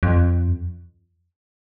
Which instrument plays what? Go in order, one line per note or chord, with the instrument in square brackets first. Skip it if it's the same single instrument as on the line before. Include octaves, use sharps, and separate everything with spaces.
[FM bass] F2